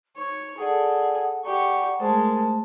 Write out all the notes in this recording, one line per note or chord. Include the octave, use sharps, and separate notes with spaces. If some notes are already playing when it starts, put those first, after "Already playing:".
D#4 C#5
G#4 A4 D5 F#5 G#5
G4 D5 F#5 A#5 C#6
G#3 A3 A#4 C5 A5